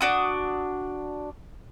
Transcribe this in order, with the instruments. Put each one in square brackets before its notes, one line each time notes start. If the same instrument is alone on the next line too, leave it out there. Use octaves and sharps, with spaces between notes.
[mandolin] D4 F#4 D#6